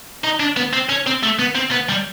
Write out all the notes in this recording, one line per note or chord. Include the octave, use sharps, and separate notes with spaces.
D#4
D4
B3
C4
C#4
C4
A3
B3
C4
B3
G3